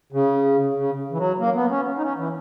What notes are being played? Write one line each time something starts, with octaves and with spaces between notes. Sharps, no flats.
C#3
C#3
E3
F#3
A#3
B3
C#4
D#4
C#4
E3